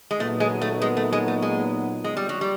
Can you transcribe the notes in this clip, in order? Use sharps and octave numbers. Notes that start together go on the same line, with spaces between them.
G#3
A#2 F#3 A3 B3 D#4
G#3
A3
G#3
A3
G#3
A3
G#3
G#3
G3
F#3
G3